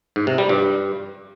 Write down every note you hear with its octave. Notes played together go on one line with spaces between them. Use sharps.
G#2
C3
G3
G2